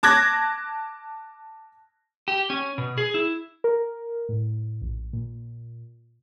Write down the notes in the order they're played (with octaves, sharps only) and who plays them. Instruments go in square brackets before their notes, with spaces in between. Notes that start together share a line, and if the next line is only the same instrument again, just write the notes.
[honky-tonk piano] A5 D6 F#6 G#6 A#6
[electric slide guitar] G4
C#4
B2
G#4
E4
[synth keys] A#4
A2
A#1
A#2